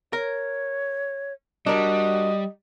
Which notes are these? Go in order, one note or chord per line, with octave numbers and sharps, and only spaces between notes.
A#4 C#5
G3 D4 F#4 A#4 D#5